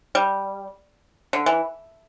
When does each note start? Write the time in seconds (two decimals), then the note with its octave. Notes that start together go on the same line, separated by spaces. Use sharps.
0.15 G3
1.33 D3
1.46 E3